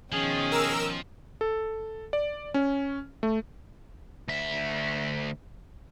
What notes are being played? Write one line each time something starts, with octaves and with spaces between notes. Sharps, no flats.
B2 D#3 F3 C#4 G#4
A#4 E6
A4
D5
C#4
A3
D2 E5